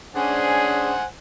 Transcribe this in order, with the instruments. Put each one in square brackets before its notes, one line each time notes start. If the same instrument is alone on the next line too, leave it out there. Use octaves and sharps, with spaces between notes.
[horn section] C#4 D4 G#4 [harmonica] C5 F#5 G#5